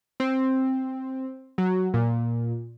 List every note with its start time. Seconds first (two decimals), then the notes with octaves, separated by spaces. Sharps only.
0.20 C4
1.58 F#3
1.94 A#2